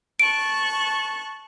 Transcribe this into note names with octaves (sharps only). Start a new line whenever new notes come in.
A5 C#6 F#6 D7